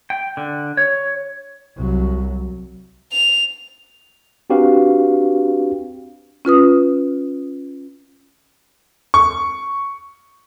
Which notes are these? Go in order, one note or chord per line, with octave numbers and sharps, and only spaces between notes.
G5
D3
C#5
C2 F#3
F7
C4 D4 F#4 G4 B4 F5
C#4 F4 B4 D#6
C#6